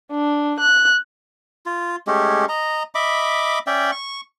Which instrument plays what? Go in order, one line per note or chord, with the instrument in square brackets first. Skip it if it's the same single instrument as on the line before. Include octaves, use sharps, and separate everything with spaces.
[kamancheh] D4
F#6
[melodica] F4
G#3 A3 C#4 G4
D#5 A#5
D#5 E5 B5 D6
C#4 D5 E5 G5
C#6